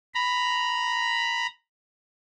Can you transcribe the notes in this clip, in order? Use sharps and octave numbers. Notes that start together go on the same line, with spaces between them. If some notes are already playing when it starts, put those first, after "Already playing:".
A#5 B5